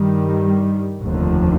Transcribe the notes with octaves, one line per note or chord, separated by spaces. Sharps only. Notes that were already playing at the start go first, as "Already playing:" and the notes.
Already playing: G2 D#3 G3
F1 D#2 D3 F3